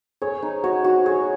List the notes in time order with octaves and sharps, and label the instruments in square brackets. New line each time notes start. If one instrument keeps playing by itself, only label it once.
[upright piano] G#4 [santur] C#5
[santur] D#4
[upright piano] F#4 [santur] C#5
[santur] F#4
[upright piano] G#4 [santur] C#5